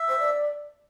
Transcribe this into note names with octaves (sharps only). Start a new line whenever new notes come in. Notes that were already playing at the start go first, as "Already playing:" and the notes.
Already playing: E5
C5
D5